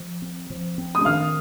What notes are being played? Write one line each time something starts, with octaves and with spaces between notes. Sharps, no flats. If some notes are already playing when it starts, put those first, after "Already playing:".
Already playing: F3
C4
F3
C4
D#6
D#3 F5 F6